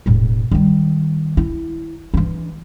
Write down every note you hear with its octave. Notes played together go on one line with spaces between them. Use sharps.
E1 A2
D#3 G3
E4
E3 D4